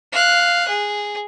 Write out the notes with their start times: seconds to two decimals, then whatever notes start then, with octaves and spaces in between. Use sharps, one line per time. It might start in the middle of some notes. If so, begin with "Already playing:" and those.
0.12 F5 F#6
0.68 G#4